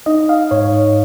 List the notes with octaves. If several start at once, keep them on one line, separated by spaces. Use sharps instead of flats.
D#4 D#5
F5
G#2 C#5